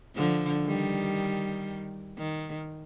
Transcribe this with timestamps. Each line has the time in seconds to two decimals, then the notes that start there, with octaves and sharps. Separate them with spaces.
0.15 D3 F3
0.66 D#3 G3
2.18 D#3